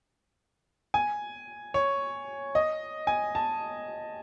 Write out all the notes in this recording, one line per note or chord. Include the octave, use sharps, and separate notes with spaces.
G#5
C#5
D#5
G#5
A5